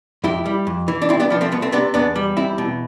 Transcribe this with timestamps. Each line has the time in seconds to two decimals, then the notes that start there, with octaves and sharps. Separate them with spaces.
0.24 F2 E4 G4
0.46 G3
0.67 F2
0.88 E3
1.02 D4
1.09 C2 C4 E4
1.20 B3 D4
1.30 F3 B3 D4
1.41 A3 C4
1.52 C2 B3
1.62 A3 C4
1.72 C3 B3 D4
1.94 E2 B3 D4
2.16 G3
2.37 E2 C4 E4
2.58 B2